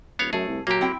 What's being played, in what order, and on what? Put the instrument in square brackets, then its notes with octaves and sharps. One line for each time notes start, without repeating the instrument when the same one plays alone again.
[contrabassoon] D#1 [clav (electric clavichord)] B3 C#5 F5
[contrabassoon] F#2 [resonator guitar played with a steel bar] A3 [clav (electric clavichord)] G#4
[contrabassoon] C2
[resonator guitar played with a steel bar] A#2 A#5 [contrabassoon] F#3 [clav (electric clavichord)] A#3 G4
[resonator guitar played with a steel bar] C4 E4 G5